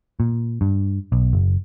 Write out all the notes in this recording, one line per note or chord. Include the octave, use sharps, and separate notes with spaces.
A#2
G2
B1
F#1